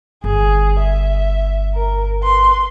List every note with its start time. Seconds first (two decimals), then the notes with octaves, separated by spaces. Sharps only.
0.24 G1 G#4
0.80 E5
1.74 A#4
2.22 B4 C6